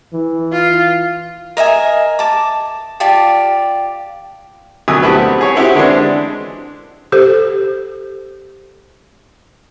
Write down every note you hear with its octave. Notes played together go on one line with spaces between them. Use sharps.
E3
F4
A#4 D#5 E5 G#5
A5 D6
F4 G4 D5 A5
D2 B2 F#3 G#5 D#6 E6
A3 C4 E4 F#4 G4 B4
G4 G#4 C#5
C4 E4 F#4 G4
D3 E3 G#3 C4 D4
G4 A4 C5